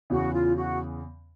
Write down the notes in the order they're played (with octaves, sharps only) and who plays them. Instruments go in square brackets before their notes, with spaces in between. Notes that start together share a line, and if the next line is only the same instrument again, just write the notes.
[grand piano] E2 C#3 E3 [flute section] F#4
[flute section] F4
F#4